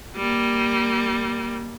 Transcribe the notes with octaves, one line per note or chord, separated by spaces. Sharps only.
G3 A#3